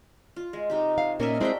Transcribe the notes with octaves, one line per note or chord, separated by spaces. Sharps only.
F4
G#3
C3 D#4 G4
F5
A#2 A#3 C#4 A#4 D#5 E5
G#3 C4 D4 E4 F#4 G5